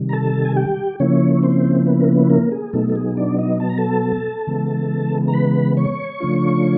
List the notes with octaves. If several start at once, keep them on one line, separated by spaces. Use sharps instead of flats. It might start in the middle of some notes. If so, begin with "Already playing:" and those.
Already playing: C3 D#3 G3
A#5
A4 A5
G#5
G4 G5
C#3 F3 A#3 C#4 E4 C#5
C4 C5
B3 B4
A#4
B3 B4
A#3 A#4
G#4
B2 F#3 A3 B3 D#4 A4
A4
G#4
D4 D5
D#4 D#5
A5
A#5
A4 A5
C#3 E3 G#3 B3
A#5
B4 B5
C#5 C#6
C#3 F3 A3 D4 F4